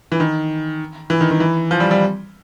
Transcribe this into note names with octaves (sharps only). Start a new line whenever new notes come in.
E3
D#3
E3
D#3
D#3
E3
F3
G3
G3